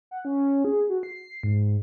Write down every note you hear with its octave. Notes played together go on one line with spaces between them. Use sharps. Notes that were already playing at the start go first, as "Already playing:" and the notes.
F#5
C#4
G#4
F#4
C7
G#2